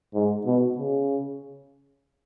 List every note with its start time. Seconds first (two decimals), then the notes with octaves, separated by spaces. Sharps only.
0.14 G#2
0.45 B2
0.78 C#3